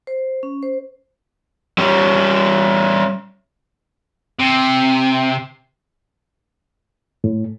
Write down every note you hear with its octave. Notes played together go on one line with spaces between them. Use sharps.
C5
C#4
C5
G3 C#4
C3
A2